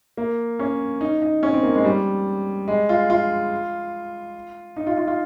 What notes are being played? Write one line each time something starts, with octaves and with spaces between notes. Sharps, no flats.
A#3
C#4
D#4
D#4
C#4
C4
A#3
G#3
G3
G#3
F4
F4
D#4
F4
F4
F4